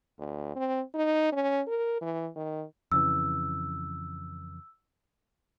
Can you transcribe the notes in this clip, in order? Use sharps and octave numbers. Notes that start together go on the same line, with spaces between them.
D2
C4
D#4
C#4
A#4
E3
D#3
F2 C#3 E3 E6